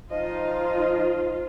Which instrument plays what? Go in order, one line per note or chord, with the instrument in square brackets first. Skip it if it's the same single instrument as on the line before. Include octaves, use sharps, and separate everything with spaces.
[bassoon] F3 [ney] D#4 [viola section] F4 [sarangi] D#5